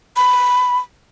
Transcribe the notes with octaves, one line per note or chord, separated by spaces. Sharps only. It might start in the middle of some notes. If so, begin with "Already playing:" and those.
B5